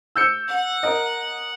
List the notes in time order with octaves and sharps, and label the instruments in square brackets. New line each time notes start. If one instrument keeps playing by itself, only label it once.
[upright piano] E6 G6 C#7
[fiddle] F#5
[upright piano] A#4 D#5